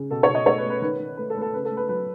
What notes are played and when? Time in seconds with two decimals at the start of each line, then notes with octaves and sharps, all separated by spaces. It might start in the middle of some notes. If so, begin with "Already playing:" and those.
Already playing: C#3
0.11 B2 A4
0.23 C#5
0.28 B2
0.35 D#5
0.46 A3 C#5
0.58 B4
0.65 A3
0.70 B4
0.82 D#3 B4
1.00 D#3
1.17 A3 B4
1.30 A4
1.36 A3 B4
1.42 A4
1.54 C#3 B4
1.65 A4
1.71 A3
1.77 B4
1.89 F#3 B4